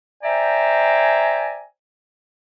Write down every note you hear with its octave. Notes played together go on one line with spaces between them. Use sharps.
C5 D5 E5 G5 G#5 A#5